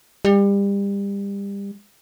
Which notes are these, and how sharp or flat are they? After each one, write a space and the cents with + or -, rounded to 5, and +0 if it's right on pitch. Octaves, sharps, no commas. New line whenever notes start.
G3 +30